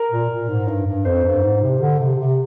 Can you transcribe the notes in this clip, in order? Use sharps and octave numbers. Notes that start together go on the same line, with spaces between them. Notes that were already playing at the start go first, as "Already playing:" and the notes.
Already playing: A#4
A#2
A#2
G#2
G2
G2
F2 C5
G2
G#2
C3
D3
C3
C3